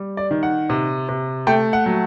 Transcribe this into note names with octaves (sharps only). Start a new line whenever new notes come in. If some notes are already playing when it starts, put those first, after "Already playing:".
Already playing: G3
D5
D#3
F#5
C3
C3
A3 G5
F#5
F#3